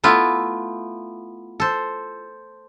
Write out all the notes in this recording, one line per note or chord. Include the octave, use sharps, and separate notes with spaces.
A3 B3 E4 F4
A4 C5